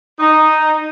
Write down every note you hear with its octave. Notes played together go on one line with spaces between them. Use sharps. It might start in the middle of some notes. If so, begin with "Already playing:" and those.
D#4